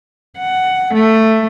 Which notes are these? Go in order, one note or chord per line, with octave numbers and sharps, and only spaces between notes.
F#5
A3